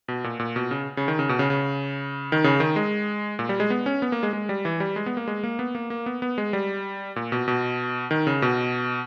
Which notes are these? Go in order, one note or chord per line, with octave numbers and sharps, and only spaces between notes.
B2
A#2
A#2
B2
C#3
C#3
D#3
C#3
B2
C#3
C#3
D#3
C#3
D#3
G#3
A#2
G3
G#3
B3
C#4
B3
A#3
G#3
G#3
G3
E3
G3
G#3
B3
A#3
G#3
A#3
B3
A#3
A#3
B3
B3
G#3
G3
A#2
B2
B2
D#3
C#3
B2